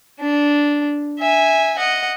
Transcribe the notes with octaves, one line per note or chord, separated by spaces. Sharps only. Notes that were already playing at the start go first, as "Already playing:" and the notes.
D4
E5 G#5
D#5 F#5